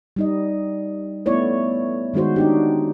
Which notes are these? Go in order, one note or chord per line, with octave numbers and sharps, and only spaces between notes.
G3 D#4 D#5
A3 B3 E4 C#5 D5
D#3 G#3 D#4 F#4 C5
D4 D#4 G4